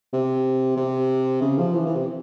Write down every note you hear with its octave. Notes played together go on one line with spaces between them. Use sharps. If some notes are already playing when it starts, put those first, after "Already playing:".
C3
C3
C#3
F3
E3
E3
C3